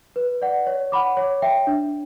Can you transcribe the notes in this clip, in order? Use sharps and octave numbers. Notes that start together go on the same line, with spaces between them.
B4
D5 F#5
C#5
F#5 B5 D6
C#5
E5 G5
D4